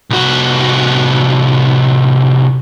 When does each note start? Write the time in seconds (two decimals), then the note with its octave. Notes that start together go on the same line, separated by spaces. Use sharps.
0.10 C2 F#4